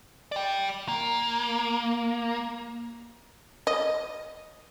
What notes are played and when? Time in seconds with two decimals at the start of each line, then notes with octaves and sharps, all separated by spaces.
0.32 D5 G5
0.88 A#3
3.67 D#5